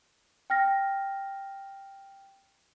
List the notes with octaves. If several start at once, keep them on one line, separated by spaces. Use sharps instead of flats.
G5 F6 A#6